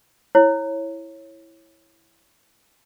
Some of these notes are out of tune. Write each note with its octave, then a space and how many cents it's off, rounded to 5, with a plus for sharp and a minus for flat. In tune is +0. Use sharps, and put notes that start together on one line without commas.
E4 +0 C#5 -15